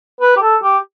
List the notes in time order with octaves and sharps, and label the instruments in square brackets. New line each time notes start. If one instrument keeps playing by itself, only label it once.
[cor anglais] B4
G4
A4
G4